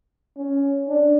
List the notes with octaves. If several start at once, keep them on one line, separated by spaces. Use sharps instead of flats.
C#4
D4